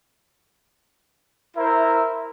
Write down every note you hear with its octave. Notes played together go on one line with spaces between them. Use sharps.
E4 A#4 C5 E5